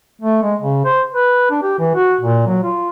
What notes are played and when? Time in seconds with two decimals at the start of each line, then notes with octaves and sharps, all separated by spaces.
0.21 A3
0.42 G#3
0.61 C#3
0.84 C5
1.13 B4
1.50 D4
1.63 G4
1.79 E3
1.95 F#4
2.20 A#2
2.46 F#3
2.64 F4